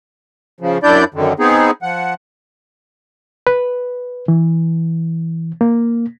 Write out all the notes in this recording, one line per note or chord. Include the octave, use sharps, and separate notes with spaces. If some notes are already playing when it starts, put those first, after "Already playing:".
C#3 F3
F#2 D4 E4 D5 G6
F#2 D3 D#3
B3 C4 D#4 G#4
F3 F#5
B4
E3
A#3